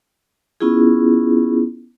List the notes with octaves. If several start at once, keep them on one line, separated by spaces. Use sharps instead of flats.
B3 C#4 E4 F4 G#4